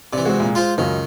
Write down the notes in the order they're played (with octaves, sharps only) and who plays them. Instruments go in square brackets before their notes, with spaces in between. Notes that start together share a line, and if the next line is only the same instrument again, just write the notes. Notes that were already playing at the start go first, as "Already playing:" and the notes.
[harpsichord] C3 E3 [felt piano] D5
[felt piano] G#3 [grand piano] C4 F#4
[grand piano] A#2
[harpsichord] F4 C5 [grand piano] C6
[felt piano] C#2 [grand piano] F#2 [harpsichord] D#3